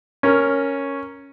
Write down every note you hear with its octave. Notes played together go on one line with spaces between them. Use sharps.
C#4 A#4